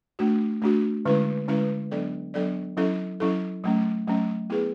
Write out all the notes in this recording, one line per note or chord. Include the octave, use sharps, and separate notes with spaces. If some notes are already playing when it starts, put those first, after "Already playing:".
A3 D4 F#4
A3 D4 F#4
D3 G#3 C#4 E4 B4
D3 G#3 C#4 E4 B4
F#3 B3 D4 A4 D5
F#3 B3 D4 A4 D5
F#3 C#4 E4 A4
F#3 C#4 E4 A4
F#3 A3 C#4
F#3 A3 C#4
B3 E4 G#4 B4